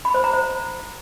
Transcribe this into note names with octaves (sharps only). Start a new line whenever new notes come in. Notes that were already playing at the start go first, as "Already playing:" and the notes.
B5
C5
A#5
C5